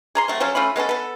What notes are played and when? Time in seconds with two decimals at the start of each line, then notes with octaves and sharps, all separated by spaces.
0.15 G#4 A#5 C6
0.28 F#3 A3 C4
0.40 F3 F#3 C#4 A4
0.55 A3 C#4 F4 B5
0.76 G#3 B3 C#4 A4
0.89 B3 A4